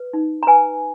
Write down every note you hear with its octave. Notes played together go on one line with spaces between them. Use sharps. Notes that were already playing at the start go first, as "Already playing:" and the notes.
Already playing: B4
D#4
A#5
B4 G#5